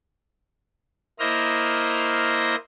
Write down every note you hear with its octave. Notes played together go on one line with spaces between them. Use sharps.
A#3 E4 C5 D#5 A#5 F6